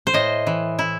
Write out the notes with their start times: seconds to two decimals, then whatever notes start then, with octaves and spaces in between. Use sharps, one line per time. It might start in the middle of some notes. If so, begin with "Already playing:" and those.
0.07 C5
0.14 A2 D#5
0.47 E3
0.79 E4